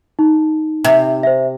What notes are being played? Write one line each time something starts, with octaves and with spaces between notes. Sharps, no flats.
D#4
C3
C5 E5